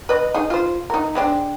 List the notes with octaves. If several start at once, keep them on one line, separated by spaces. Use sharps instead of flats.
B4 D#5
D#4 G#4
F4 C5
D#4 A#4
G#3 C4 D4